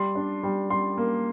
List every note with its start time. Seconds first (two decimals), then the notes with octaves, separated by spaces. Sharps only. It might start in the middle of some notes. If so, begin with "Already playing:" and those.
Already playing: G3 C6
0.15 D4
0.43 G3
0.70 G3 C6
0.98 A#3